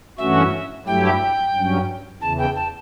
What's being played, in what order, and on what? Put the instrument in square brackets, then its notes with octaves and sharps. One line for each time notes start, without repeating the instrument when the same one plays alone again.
[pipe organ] G2 E3 A3 C#4 F#4 [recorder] E5
[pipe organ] G2 F#3 A3 E4 G4 [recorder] G5
[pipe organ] G2 F#3 C#4
[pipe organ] E2 C#3 E3 [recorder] A5
[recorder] G5
A5